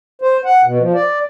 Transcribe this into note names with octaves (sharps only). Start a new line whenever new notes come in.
C5
F#5
B2
F3
D5